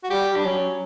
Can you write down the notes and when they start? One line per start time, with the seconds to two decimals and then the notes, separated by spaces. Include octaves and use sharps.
0.04 F#4
0.10 G3 G4
0.35 G3 D4
0.45 F#3 C#4